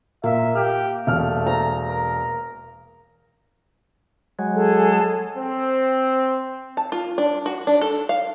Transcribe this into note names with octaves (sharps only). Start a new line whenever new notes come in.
A#2 A#3 E5
G4 F6
E1 A3 F6
A#5
A#4
F#3 G#3
G#4 A4
C4
A5
F4
D4
F#4
D4
A4
F5